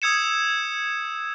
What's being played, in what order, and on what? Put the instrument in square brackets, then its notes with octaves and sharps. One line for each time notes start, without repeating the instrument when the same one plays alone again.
[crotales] D#6 E6 G#6 C#7 E7